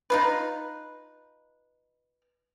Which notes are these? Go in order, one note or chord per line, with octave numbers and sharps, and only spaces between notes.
D#4 F4 B4